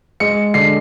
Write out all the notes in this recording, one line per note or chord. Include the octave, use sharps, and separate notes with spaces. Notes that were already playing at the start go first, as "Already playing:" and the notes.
G#3 C#7
D3 C7